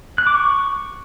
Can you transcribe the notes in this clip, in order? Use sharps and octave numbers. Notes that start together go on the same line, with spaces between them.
F#6
D6
C#6